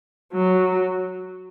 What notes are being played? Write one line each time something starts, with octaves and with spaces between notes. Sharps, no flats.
F#3